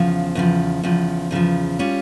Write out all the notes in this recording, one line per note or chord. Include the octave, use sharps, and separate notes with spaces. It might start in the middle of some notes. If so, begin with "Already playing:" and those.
Already playing: E2 C#3 F3
E2 C#3 F3
E2 C#3 F3
E2 C#3 F3
G3 C#4 F4